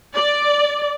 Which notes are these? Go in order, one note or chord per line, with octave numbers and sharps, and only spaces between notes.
D5